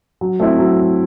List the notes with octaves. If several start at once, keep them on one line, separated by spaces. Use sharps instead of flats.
F#3
A3 C4 E4
F#3